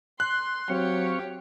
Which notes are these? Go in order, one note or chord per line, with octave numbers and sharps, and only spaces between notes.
C6 F#6
F#3 C4 G4 C#5 F5 C#6